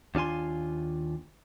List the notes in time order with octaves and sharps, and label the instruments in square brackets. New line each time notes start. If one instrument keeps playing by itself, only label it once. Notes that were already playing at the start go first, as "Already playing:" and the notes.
[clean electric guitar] D#2 D4 F4 G#5 C6